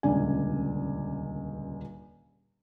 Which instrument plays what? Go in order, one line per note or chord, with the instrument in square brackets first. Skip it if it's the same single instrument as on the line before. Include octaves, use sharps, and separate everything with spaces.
[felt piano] D#1 C#2 D3 D4 D5 G#5